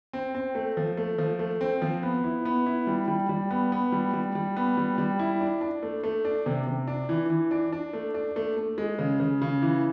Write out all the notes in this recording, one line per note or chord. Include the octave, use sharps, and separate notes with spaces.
C4
C4
A3
F3
A3
F3
A3
C4
F3
B3
E4
B3
E4
G3
G3
G3
B3
B3
G3
G3
G3
B3
G3
G3
E4
D4
D4
A3
A3
D4
C3
C3
D4
E3
E3
D4
D4
A3
D4
A3
A3
G#3
C#3
C#3
C#3
E3